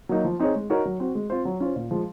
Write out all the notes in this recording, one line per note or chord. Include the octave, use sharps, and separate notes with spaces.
F#3 A#3 D#4
F3
C4 D#4 G#4 C#5
G#3
D#4 F#4 A#4 C#5
F#3
C4 F#4
G#3
C4 F4 C5
F#3
C#4 F4 C5
A#2
F3 G#3